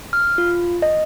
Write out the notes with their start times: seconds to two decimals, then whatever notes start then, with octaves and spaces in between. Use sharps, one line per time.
0.13 F6
0.38 F4
0.82 D#5